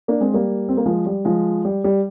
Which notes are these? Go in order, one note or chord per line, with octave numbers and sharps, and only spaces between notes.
A#3 D4
G#3 C4
G3 A#3
C4
A#3
F3 G#3
G3
F3 G#3
G3
G3